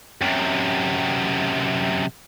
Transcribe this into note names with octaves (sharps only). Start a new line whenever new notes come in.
F#2 C3